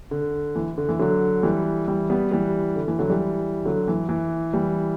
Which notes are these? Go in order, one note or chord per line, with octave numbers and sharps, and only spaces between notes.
D3
E3
D3
E3
D3 F#3
E3 G3
E3 G3
G3 B3
E3 G3
D3
E3
D3 F#3
E3 G3
D3 F#3
E3
E3
E3 G3